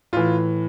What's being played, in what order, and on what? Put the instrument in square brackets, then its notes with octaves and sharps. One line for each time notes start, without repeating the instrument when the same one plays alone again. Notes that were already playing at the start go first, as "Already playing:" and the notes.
[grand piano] A2 E3 F4